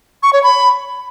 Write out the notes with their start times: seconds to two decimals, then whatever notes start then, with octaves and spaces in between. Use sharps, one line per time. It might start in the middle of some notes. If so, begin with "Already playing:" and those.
0.23 C#6
0.33 C#5
0.43 B5